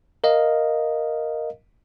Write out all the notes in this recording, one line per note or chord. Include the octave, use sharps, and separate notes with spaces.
A#4 D#5 F5